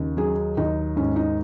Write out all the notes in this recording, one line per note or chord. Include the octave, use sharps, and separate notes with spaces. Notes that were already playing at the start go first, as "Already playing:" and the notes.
Already playing: D#2 C#3
F#3 G#4
D#2 D#4
G#2 C#4
D#4